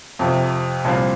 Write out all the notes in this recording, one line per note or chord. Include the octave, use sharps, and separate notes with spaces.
F2 C3 F3
C2 A#2 F3 C4